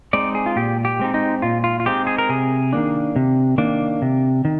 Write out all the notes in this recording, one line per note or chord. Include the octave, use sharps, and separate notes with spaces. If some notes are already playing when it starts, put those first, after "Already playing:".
G#3 C4 D#4 D5
G#4
F4
A#2 G4
G4
G#3 C4 D#4
D#4
A#2 F4
F4
F4
G#3 C4 D#4 G4
G#4
A#4
C3 G#4
D#3 A#3 D4
C3
D#3 A#3 D4
C3
D#3